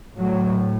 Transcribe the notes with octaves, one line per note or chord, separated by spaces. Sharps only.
A2 F#3